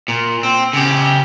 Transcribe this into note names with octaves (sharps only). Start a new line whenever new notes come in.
A#2
C4
C#3 G4